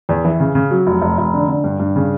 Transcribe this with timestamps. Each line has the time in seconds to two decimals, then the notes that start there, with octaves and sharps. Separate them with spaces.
0.09 E2
0.25 E3
0.40 C#3
0.55 C#3
0.71 F#3
0.87 F1
1.02 F1
1.18 F1
1.34 D3
1.48 D3
1.64 G2
1.79 G2
1.96 C#3